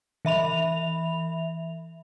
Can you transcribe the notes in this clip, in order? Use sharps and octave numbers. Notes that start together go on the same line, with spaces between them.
E3 E5 B5 F7